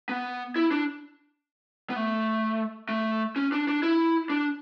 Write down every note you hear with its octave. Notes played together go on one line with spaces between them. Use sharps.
B3
E4
D4
B3
A3
A3
C#4
D4
D4
E4
D4